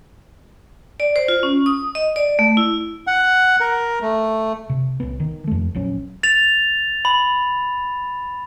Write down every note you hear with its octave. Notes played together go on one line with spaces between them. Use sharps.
D5
C5
F4
C#4
D#6
D#5
D5
A3
E4
F#5
A#4
A3
C3
C2 B3
D#3
F2 A3
A#1 F#3 C#4
A6 F7
B5